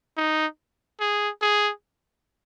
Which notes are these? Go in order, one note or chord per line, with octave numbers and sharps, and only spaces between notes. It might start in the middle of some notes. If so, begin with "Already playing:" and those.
D#4
G#4
G#4